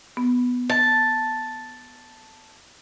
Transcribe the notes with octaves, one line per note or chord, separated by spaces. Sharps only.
B3
A5